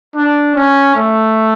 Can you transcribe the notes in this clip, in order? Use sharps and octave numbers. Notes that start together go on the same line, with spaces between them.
D4
C#4
A3